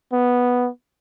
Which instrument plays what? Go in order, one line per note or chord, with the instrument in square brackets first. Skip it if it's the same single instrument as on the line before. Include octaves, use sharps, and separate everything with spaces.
[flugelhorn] B3